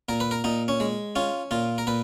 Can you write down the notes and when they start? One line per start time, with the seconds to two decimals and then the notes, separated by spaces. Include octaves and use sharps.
0.09 A#2 A#4
0.20 B4
0.31 A#4
0.44 A#2 D#4
0.68 C#4
0.80 G#3
1.16 C#4 F4
1.51 A#2 F4
1.78 A#4
1.87 A#2 B4